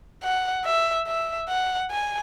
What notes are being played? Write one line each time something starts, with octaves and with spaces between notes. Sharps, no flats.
F#5
E5
E5
F#5
G#5